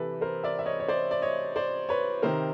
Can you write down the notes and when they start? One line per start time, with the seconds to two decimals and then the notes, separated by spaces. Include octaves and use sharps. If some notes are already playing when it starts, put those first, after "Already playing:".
Already playing: C3 E3 G4 A4 B4
0.21 A#4 C5
0.44 D5 E5
0.59 E5
0.66 C#5 D#5
0.80 C#5
0.88 C5 D5
1.11 D5
1.22 C#5 D#5
1.56 C5 D5
1.89 B4 C#5
2.22 C3 D#3 A#4 C5